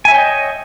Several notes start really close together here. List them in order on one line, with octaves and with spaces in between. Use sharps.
G#5 E5 C#5 G5 D#5